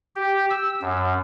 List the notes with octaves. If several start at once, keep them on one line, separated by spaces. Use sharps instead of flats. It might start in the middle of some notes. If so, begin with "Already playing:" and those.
G4
E6
F#2